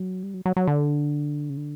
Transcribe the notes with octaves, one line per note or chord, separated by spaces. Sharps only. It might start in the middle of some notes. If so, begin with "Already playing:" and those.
Already playing: F#3
G3
F#3
F#3
F#3
D3
C#3
D3